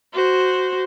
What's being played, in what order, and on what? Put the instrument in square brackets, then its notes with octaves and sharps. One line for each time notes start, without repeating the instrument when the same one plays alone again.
[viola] F#4 C5